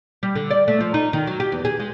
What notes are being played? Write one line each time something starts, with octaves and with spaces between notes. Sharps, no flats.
G3
D3
D5
A3
F3
D#4
D#3
F#3
G4
E2
G#4
G#3